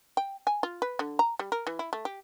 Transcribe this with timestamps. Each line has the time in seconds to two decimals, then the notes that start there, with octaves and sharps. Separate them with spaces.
0.17 G5
0.47 G#5
0.63 F4
0.82 B4
0.99 D3
1.19 A#5
1.39 G3
1.52 A#4
1.67 E3
1.79 E4
1.93 A3
2.05 G4